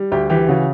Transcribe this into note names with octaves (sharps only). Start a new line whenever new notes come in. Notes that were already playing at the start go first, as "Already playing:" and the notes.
Already playing: G3
D2 G4
E3 G4
C#3 F#4